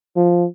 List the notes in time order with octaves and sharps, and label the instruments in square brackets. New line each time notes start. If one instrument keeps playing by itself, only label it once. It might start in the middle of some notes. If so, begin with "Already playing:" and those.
[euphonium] F3